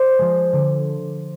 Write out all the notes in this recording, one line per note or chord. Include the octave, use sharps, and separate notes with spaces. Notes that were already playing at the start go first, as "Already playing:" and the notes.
Already playing: C5 D5
F3 G#3
D3